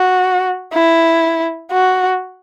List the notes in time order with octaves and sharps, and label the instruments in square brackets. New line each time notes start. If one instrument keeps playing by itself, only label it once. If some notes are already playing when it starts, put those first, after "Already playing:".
Already playing: [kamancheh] F#4
E4
F#4